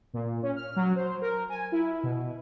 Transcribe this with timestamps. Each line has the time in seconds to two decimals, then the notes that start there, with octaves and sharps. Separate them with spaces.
0.14 A#2
0.43 C#4
0.56 F6
0.76 F#3
0.96 C5
1.21 A#4
1.49 G#5
1.72 E4
2.03 B2